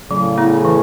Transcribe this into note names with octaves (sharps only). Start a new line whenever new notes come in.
A2 C#3 F#3
B3 E4
E3